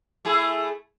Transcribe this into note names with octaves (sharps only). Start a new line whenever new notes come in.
A3 E4 G#4